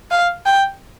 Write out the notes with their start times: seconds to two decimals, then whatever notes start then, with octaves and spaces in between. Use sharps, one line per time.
0.11 F5
0.46 G5